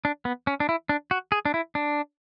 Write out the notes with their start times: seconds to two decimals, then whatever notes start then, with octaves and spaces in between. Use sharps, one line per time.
0.05 D4
0.25 B3
0.47 C#4
0.60 D4
0.69 E4
0.89 D4
1.11 F#4
1.32 G#4
1.45 D4
1.54 E4
1.75 D4